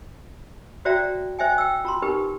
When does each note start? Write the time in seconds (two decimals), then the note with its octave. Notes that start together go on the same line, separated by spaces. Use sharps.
0.85 F#4 C5 D5 E5 G5 A#5
1.39 C5 D#5 E5 G5 G#5
1.58 G5 E6
1.85 F4 A#5 C6
2.02 D#4 G4 A#4 B4